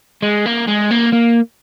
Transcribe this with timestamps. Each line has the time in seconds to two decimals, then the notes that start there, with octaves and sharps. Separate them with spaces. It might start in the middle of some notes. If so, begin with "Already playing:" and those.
0.22 G#3
0.46 A#3
0.67 G#3
0.91 A#3
1.12 A#3